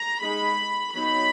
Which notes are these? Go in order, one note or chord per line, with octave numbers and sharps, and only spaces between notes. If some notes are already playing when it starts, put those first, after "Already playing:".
Already playing: A#5
G#3 D#4 B5
F#3 B3 D#4 B5